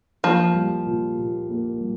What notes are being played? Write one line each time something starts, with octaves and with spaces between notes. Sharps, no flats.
F3 A#3
G3
A#2
A#2
A#3
G3